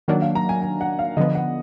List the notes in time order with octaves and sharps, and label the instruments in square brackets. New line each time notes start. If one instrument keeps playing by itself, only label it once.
[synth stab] D#3 F#3 A#3 D4 [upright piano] F#5
[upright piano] F5
A#5
G#5
G#5
F#5
F5
[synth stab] D3 F3 B3 [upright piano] D#5
[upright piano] F#5